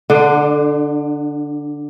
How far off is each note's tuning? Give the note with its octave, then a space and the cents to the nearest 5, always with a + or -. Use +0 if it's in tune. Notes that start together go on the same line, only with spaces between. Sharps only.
D3 +0 D4 +40